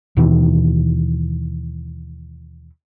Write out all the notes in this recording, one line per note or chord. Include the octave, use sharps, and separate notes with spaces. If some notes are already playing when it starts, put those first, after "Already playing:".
D#2 B2 D#3 E3